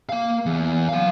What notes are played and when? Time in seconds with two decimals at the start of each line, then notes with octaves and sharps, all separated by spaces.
0.09 A#3 F5
0.46 E2
0.89 F#3 F5